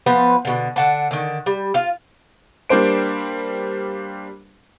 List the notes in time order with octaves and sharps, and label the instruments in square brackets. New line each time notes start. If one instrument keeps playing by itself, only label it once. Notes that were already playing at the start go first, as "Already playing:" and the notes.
[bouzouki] F3 B3 B4 C5
B2 D3
D3 F#5 A5
D3 D#3
G3
F4 F5
[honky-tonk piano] G3 A#3 D4 C5 D7